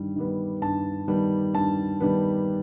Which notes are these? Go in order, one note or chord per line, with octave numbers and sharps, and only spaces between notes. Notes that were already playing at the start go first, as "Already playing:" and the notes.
Already playing: G2 D#3 G3
D#3 G3 B3
G2 A5
D#3 G3 B3
G2 A5
D#3 G3 B3